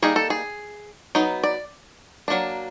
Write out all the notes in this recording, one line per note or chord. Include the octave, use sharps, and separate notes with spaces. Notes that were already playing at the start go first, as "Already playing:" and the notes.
G3 A#3 D#4 G#4
A4
G#4
F#3 B3 D#4
D5
F#3 A#3 D4